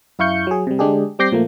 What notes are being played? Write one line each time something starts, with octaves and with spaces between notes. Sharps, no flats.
F#2 E4 F5 C#6 G6 C#7
F#3 G#4
C3 G3
D3 G#3 D4 G4 G#4
G3 C4 D6 G6 A#6 C7
A#2 F3 A3 A#3